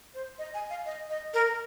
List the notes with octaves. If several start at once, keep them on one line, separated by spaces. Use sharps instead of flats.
C5
D#5
G#5
F5
D#5
D#5
A#4